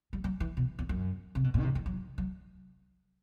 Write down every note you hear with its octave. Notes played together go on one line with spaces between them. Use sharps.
G3
F#3
E3
B2
E2
F#2
C3
B2
A2
D#3
C3
D#3
F#3
F#3